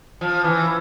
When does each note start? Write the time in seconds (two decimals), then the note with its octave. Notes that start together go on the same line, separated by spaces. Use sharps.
0.21 F3
0.44 E3